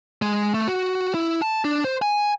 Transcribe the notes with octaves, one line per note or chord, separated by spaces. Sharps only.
G#3
A3
F#4
E4
A5
D4
C5
G#5